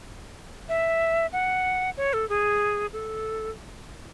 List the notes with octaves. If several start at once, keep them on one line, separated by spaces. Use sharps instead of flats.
E5
F#5
C#5
A4
G#4
A4